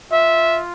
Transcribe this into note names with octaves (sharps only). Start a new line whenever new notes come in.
F4 E5